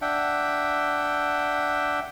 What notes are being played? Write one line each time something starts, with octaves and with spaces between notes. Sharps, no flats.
D4 E5 F#5 G5